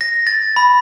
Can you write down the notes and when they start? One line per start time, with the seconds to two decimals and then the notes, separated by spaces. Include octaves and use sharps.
0.01 A#6
0.27 A6
0.56 B5